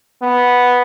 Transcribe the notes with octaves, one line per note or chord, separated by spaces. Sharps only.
B3